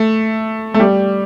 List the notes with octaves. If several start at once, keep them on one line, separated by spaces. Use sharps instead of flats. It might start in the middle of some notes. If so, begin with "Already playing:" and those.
Already playing: A3
A3
G3